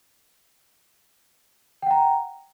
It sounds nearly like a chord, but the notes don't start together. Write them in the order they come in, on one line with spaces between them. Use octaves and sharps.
G5 F#5 A#5